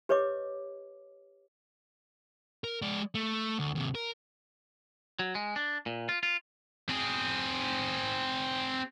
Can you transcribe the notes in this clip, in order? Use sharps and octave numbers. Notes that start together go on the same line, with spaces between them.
G4 B4 C#5 D#5 D6
A#4
G#3 D5
A3
D2
D#2 C3
A#4
F#3
G#3
D4
A#2
F4
F4
C4 G#4